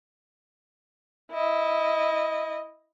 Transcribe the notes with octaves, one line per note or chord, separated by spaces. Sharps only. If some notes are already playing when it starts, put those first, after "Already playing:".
E4 D#5